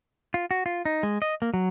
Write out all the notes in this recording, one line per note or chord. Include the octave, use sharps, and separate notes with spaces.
F4
F#4
F4
D#4
G#3
D#5
A#3
F#3